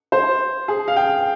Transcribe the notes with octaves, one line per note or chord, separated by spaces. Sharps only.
C5
G#4
F5
G5